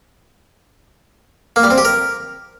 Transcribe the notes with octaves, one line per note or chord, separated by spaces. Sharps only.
A#3
G3
C4
G4
A#4